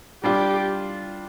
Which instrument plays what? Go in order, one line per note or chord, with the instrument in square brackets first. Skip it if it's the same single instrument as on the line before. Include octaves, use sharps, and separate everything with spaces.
[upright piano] G3 D4 F4 [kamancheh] G4